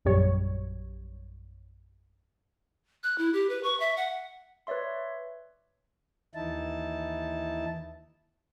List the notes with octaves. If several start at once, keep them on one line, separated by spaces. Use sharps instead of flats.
A#1 F#2 G3 C#5
F#6
E4
G4
B4
C#6
E5
F#5
B4 C#5 D5 E5 C6
D#2 E3 D#4 E4 A5